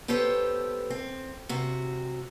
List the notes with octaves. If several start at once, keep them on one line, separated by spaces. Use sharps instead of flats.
B3 G4 A4 C5 C#5
C4
C3 F#4